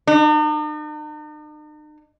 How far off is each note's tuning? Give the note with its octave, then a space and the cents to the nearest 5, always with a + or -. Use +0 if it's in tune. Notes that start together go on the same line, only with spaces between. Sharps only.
D#4 -45